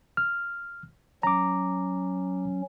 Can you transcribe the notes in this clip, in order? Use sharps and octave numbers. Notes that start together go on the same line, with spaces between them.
F6
F#3 C#4 A#5 D6